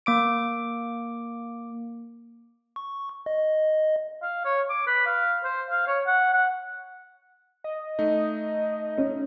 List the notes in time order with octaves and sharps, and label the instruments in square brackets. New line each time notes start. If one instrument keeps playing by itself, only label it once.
[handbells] A#3 D6 D7
[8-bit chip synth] C#6
D#5
[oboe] F5
C#5
D6
B4
F5
C5
F5
C#5
F#5
F#5
[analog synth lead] D#5
[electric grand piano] A3 D#4
[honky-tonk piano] C#4